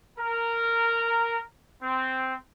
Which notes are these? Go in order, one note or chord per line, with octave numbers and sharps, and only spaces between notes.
A#4
C4